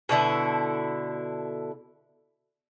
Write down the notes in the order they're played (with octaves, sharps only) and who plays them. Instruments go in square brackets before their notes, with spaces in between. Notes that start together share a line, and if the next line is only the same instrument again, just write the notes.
[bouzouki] B2 D3 E4 A4